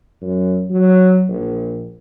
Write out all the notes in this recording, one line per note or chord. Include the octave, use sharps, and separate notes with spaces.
F#2
F#3
A#1